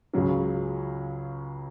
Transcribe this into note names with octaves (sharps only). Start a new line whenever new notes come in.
C#2 C#3 F#3 C#4